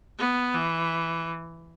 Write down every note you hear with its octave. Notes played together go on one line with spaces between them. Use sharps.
B3
E3